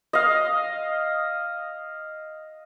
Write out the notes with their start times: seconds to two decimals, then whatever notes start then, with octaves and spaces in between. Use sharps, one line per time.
0.13 D#5 F5